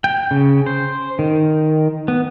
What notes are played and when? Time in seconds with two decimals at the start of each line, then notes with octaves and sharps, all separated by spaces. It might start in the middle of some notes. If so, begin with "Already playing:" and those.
0.04 G5
0.31 C#3
0.66 C5
1.19 D#3
2.08 B3